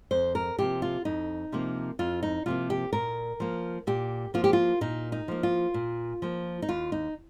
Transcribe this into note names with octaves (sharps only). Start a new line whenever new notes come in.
F2 C5
A#4
C3 F3 A#3 G4
F4
F2 D#4
C3 F3 A#3
F2 F4
D#4
C3 F3 A#3 F4
G4
A#2 A#4
F3 A#3
A#2 G4
F3 A#3 F4
G4
F4
A#2 D#4
D#4
F3 A#3
F4
A#2
F3 A#3
D#4
D#2 F4
D#4